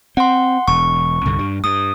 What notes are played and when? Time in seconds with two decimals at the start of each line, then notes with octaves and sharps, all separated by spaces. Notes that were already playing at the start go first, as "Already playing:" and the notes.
0.17 C4 F#5 C6
0.68 E1 C#6
1.25 C2 G2 D3
1.39 G2 G3
1.64 G2 D#6